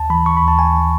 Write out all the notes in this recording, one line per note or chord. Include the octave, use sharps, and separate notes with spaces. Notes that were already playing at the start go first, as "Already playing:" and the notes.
Already playing: D#2 A5
E3 B5
D#2 C#6
B5
D#2
A5
E3 G#5
D#2